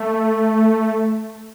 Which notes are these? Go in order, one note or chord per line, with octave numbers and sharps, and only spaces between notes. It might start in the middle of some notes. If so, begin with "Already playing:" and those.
Already playing: A3